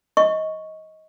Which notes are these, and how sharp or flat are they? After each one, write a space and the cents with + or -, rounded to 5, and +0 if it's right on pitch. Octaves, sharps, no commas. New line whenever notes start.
D#5 +15 C#6 +0